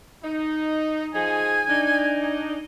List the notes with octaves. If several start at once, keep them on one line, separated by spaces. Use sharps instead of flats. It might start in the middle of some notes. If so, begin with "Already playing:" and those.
D#4
F3 D#4 G#4 G#5
D4 D#4